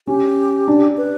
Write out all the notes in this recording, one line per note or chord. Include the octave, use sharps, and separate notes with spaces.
C#4 G4
D4
B4